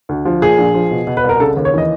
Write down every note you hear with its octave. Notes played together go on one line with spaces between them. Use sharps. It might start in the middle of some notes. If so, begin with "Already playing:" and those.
D2
F3
A#2 G#4
A#1
F3
B2
B2
B4
C2
A#4
C#3 A4
D#2
C#5
E3 D#5